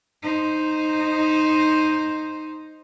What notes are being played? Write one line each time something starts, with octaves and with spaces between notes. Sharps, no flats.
D#4 C5